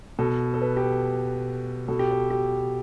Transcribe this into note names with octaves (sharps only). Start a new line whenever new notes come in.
B2 A4
A4
B4
G4
A4
B2 A4
G4
A4
G4